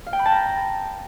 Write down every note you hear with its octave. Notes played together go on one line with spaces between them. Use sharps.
F5
G5
B5
A5
A#5